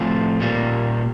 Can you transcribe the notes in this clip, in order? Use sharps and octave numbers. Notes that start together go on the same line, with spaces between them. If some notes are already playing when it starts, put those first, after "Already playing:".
Already playing: A2 F3 A3 C4 F4
A#2 G3 A#3